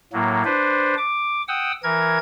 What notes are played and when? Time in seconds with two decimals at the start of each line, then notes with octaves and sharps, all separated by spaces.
0.13 A2 F#3 A#3
0.45 D4 B4 C5
0.97 D6
1.48 F#5 G5 D#6 E6
1.84 E3 A#4 G#6